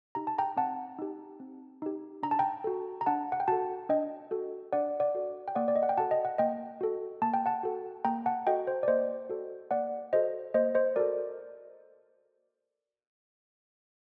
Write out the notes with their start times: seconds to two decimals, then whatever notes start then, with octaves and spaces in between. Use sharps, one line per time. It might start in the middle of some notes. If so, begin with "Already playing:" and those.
0.15 D#4 G4 A#5
0.27 A5
0.38 G5 A#5
0.57 C4 F#5 A5
0.99 D#4 G4
1.40 C4
1.82 D#4 G4
2.23 D4 A#5
2.31 A5
2.39 G5 A#5
2.64 F#4 A4
3.01 A#5
3.06 D4 F#5 A5
3.32 F#5
3.40 G5
3.48 F#4 A4 F#5 A5
3.89 D4 D#5 G5
4.31 F#4 A4
4.73 D4 D5 F#5
5.00 D5 F#5
5.15 F#4 A4
5.48 G5
5.55 A#3 D5 F#5
5.68 D5
5.76 D#5
5.83 F#5
5.89 G5
5.97 F#4 A4 F#5 A5
6.11 D#5
6.25 F#5
6.38 A#3 D#5 G5
6.81 F#4 A4
7.22 A#3 A5
7.34 G5
7.46 F#5 A5
7.63 F#4 A4
8.05 A#3 G5 A#5
8.26 F#5 A5
8.46 F#4 A4 D#5 G5
8.67 C5
8.83 D5
8.87 A#3 C5 D#5
9.29 F#4 A4
9.71 A#3 D5 F#5
10.13 F#4 A4 C5 D#5
10.54 A#3 C5 D#5
10.75 C5 D#5
10.96 F#4 A4 A#4 D5